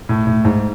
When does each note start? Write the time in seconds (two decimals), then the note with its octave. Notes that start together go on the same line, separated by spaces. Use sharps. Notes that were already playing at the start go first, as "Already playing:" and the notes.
0.09 A2
0.27 A2
0.45 G#2